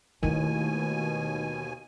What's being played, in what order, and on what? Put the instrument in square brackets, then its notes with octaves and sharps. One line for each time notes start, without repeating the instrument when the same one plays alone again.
[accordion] D#2 B2 G#5 [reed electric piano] D#3 [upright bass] A3 E4